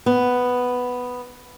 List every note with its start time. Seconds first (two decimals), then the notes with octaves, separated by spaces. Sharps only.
0.06 B3